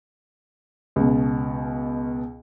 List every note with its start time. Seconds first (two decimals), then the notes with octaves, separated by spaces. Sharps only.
0.96 C#2 B2